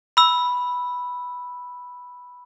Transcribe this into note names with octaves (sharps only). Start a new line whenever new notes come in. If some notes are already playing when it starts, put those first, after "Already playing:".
B5 E6